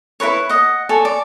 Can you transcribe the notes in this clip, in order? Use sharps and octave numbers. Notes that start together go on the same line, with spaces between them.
E4 A#4 B4 C#5
D#5 F#5
A4 C#5 D5 G#5
D5